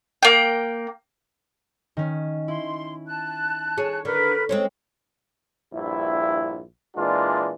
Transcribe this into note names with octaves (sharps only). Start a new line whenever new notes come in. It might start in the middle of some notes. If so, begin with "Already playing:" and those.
A#3 G5
D#3 C#4
E4 C6
A5 F#6
G#4 C#5
D3 A#4 B4
G#3 C4 C#4
A#1 G2 E4
A#2 E3 G#3 D4 F4